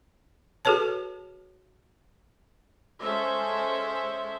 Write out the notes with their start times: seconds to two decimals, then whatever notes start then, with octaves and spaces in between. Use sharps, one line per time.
0.65 F#4 G#4 A4 B4 C#5 A5
3.03 G#3 C#4 A4 C5 E5